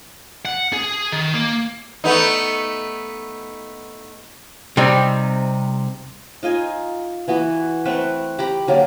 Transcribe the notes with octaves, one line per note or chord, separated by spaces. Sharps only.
F#5
G#4
D#3
A#3
A3 B3 D#4
C3 G3 C4 D#4
D#4 F4 D#5 G#5
E3 B3 F#4
A3 C4 B4 F#5
G4 A#5 B5
D3 F#3 A#3 A#4